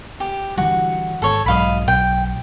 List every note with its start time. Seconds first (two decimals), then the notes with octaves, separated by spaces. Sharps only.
0.20 G4
0.58 D3 E3 G3 F#4
1.22 G#1 A4 C#5
1.46 B1 G#2 F#3 D#5 F5 B5
1.88 B1 G5